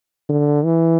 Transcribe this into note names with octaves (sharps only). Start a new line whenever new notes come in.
D3
E3